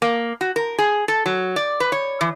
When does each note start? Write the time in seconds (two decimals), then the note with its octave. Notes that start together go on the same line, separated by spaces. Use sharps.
0.02 A#3
0.41 F#4
0.56 A#4
0.78 G#4
1.08 A4
1.26 F#3
1.56 D5
1.80 B4
1.92 C#5
2.21 E3